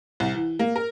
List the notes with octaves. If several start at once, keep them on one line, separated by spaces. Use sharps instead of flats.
C2
E3
A#3
A#4